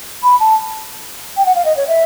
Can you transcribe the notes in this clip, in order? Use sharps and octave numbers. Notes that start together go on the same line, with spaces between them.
B5
A5
G5
F#5
F5
D#5
C#5
E5